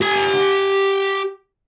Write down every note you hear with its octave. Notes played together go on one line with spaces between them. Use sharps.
G4 G#5